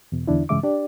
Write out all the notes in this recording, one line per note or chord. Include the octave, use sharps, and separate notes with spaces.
E2 B2
E2 D3 D4 E4
G2 C#3 E3 G#3 E5 D6
D4 G4 D5